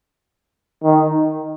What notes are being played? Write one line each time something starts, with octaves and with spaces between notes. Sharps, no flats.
D#3